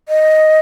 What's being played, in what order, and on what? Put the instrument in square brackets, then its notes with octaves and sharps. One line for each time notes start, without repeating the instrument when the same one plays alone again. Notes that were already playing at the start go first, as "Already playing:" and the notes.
[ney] D#5